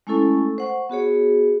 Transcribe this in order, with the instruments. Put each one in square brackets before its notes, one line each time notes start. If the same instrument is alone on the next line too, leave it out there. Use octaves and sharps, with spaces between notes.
[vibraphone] G#3 A3 C#4 E4 A4 C#6
C5 F#5 C#6
B3 F#4 G#4 C#5